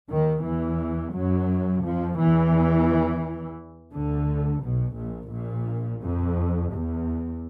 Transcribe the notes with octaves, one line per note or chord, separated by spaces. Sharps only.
D#2 D#3
E2 E3
F#2 F#3
F2 F3
E2 E3
D2 D3
B1 B2
A#1 A#2
A#1 A#2
F2
E2